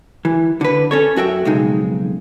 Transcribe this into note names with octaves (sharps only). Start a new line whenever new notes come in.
E3
D3 B4
C#4 A4 C#5
F#2 F#4 E5 G5
B1 F2 C#3 G#3 D#4